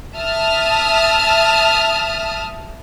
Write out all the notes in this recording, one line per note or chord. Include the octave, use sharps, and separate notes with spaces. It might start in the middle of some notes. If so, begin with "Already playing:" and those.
E5 A5 D#6 F6